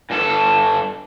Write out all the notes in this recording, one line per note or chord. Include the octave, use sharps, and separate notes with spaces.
G2 A4